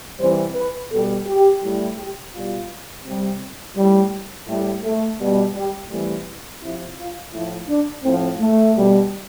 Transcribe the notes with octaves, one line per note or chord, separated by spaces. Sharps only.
C3 E3 G3 C5
B4
B2 G3 A4
G4
A2 G3
G4
B2 G3 F4
C3 G3
A2 G3
A2 G3 A3
A3
B2 G3
G3
C3 E3 G3 A3
C3 F3 E4
F4
A2 F3 E4
D4
A2 F3 C4
A3
B2 G3